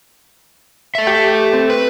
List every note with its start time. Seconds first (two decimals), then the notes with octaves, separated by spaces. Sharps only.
0.95 A4 E5
1.07 G4
1.53 C4
1.70 B4